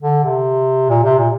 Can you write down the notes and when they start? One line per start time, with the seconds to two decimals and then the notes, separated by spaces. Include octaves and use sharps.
0.02 D3
0.24 C3
0.89 A#2
1.04 C3
1.19 A#2